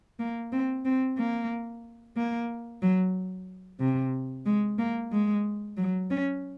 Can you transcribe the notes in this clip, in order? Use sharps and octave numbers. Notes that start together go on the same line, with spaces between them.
A#3
C4
C4
A#3
A#3
F#3
C3
G#3
A#3
G#3
F#3
C#4